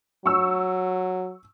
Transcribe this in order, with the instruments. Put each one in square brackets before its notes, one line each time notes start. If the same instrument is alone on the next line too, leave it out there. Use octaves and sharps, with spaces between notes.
[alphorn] F#3 [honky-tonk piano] C#6 E6